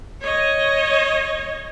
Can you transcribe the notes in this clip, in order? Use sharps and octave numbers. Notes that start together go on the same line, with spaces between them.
C#5 D#5